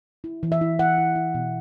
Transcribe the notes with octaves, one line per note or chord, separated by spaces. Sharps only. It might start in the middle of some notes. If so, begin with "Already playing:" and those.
E4
E3
E5
E4
E4 F#5
E3
E4
B2